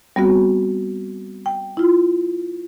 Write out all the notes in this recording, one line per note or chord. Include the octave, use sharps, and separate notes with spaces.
G3 B3 C4 F#4
G5
E4 F4